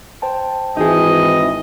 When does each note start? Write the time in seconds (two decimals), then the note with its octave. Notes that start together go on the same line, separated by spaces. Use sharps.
0.22 C5 G5 A5
0.77 G#1 E3 D#4 G#4 D#5